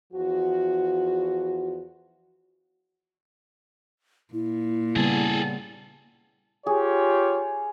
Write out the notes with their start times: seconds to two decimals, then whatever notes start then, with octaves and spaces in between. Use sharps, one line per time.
0.13 E2 F3 F#4
4.33 A#2 E4
4.96 C#3 G3 B3 G#4 A4
6.66 F4 G4 G#4 C#5